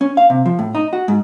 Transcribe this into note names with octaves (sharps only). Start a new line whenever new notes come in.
C#4
F5
C3
F3
A2
D#4
F#4
G#2